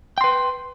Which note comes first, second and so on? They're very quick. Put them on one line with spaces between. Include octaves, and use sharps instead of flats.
G5 C6 B4